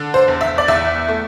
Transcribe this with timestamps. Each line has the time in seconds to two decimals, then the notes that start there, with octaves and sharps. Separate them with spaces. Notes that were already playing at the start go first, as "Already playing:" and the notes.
Already playing: D3
0.14 C5
0.28 E2
0.41 E5
0.58 D5
0.68 E2 E5
1.08 A3